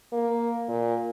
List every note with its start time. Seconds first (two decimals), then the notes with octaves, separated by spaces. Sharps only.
0.12 A#3
0.69 A#2